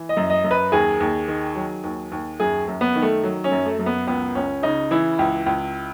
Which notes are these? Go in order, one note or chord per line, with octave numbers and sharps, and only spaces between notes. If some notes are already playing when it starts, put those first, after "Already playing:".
Already playing: E3
D#5
F#2
D#5
F#2
B4
D#2 G#4
D#2
D#3
F#3
D#2
D#2
F#2 G#4
F#2
B3
D#3
A3
F#3
C#4
F#2
A3
F#2 A3
B3
C#2 B3
C#2 C#4
C#3 D#4
E3 E4
C#2
C#2